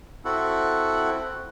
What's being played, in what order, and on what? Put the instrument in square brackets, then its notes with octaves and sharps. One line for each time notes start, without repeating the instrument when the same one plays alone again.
[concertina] C4 E4 F#4 A4 F#5